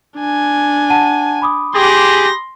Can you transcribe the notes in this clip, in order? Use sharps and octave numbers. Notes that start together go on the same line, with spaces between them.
D4 G#5
F#5 A5 D#7
B5 D6 D#6
G4 G#4 C6 A#6